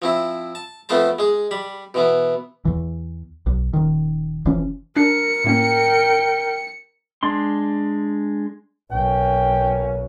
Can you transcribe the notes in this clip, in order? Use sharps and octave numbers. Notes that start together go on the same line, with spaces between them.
F3 C4 E4
A5
F2 A3 B3 C5 A5
G#3 G#4
G3 B5
B2 E3 B3
E2 E3
B1
D#1 D#3
F1 F2 E3 C#4
D4 A#4 C#7
A2 A#3 C#4 A#4 G5
G#3 D4 C6
B1 A#3 C#4 G5